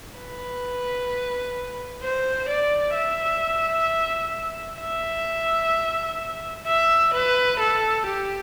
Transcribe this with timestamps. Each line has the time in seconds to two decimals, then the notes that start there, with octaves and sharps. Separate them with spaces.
0.17 B4
2.03 C5
2.49 D5
2.95 E5
4.81 E5
6.67 E5
7.14 B4
7.60 A4
8.06 G4